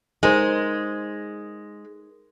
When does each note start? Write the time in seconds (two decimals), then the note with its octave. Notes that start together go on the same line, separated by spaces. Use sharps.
0.23 G#3 D#4 A#4 C5